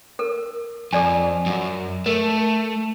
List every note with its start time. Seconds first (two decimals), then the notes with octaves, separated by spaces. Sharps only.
0.19 A4 A#4
0.93 F2 A4 D5 G#5
1.46 F#2
2.06 A3 A#4